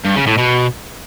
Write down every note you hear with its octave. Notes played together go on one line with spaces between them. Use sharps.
G2
C#3
A2
B2